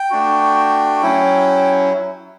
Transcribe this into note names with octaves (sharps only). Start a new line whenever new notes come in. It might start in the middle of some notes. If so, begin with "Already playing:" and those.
Already playing: G5
A3 D4 F#4
F#3 C#4 E4